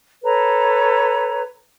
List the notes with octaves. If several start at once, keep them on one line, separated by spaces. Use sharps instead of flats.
A4 B4 C#5 A#5